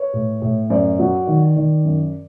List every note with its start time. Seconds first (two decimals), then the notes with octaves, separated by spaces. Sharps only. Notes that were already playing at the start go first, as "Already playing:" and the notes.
Already playing: B4 C#5
0.13 A2
0.42 A2
0.70 F#2 C5 D5
0.99 F#3
1.27 D#3
1.56 D#3
1.85 F#2